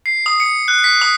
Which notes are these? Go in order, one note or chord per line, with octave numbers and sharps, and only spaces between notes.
C7
D#6
C#7
F#6
B6
D#6